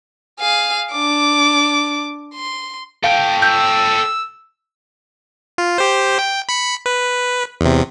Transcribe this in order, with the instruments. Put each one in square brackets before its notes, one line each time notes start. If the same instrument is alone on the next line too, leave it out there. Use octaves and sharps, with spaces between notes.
[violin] G#4 F5
D4 D6
C6
[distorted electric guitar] A4 G5 [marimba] F5
[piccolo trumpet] E6 [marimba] G6
[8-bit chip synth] F4
G4 C5
G5
B5 C#7
B4
E2 C3